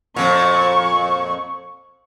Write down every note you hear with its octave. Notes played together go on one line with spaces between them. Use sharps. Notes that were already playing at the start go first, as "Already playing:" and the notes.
F2 A#2 C#6